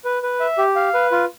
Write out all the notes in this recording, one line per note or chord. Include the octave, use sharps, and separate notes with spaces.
B4
B4
E5
G4
F5
B4
F4